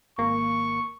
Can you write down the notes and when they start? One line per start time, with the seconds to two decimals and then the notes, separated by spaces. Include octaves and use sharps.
0.18 G#1 A#3 C#6